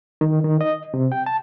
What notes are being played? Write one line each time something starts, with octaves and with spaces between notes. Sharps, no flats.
D#3
D#3
D#5
C3
G5
A5